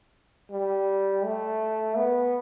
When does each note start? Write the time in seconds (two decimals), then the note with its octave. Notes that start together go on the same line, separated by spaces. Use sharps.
0.51 G3
1.25 A3
1.97 B3